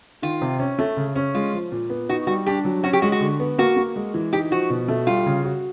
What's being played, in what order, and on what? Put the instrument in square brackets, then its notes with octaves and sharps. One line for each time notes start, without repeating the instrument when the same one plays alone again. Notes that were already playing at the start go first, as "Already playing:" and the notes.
[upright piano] D#3 [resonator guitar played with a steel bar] F4
[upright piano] C3
C#4
A3
C#3
C#4
[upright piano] G#3 [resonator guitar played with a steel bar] F4
[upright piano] F3
A#2
B3
[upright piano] D#4 [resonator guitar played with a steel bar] F#4
[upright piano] G3 [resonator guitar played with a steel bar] F#4
[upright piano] D4 [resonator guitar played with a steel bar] G4
[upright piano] F#3
[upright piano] C#4 [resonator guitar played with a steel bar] F#4
[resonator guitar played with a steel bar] G4
[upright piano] G#3 [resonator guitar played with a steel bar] F#4
[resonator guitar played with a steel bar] F#4
[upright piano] D3
B3
[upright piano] A#3 [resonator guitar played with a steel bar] F#4
[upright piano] A#3
G#3
E3
[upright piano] D#4 [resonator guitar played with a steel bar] G4
[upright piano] F3 [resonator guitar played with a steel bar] F#4
[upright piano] B2
A3
[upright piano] G3 [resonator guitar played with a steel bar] F4
[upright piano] C#3
F#4